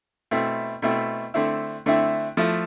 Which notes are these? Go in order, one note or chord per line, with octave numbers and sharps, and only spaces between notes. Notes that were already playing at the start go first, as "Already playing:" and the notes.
B2 A3 C4 E4
B2 A3 C4 E4
D3 A3 C4 E4
D3 A3 C4 E4
F3 A3 E4